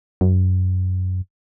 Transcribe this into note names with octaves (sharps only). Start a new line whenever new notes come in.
F#2